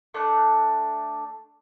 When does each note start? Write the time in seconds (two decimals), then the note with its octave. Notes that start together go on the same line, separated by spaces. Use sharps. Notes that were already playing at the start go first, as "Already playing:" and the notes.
0.14 A3 D4 F#6